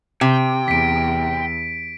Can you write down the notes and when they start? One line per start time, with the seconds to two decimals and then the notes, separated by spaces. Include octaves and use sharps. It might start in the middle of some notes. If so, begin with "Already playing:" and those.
0.21 C3 G5
0.68 E2 B6 D7